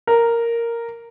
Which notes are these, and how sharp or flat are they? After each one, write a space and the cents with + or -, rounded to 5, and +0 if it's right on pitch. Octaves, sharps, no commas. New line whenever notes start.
A#4 -5